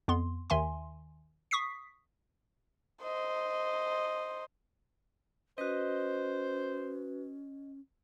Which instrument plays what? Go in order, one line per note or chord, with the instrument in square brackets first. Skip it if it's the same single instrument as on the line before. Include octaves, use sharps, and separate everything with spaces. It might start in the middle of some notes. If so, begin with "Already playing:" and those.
[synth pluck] F2 B3 C6
D#2 D#3 E5 G#5 C6
C#6 D#6 B6 C7
[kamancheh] C5 D#5
[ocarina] C#4 [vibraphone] F#4 B4 [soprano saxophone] C5 [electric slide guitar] D#5